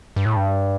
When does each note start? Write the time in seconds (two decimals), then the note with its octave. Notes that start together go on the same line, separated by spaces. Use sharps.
0.16 G2
0.26 A2
0.36 G2